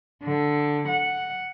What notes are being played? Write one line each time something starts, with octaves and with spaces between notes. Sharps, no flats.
D3
F#5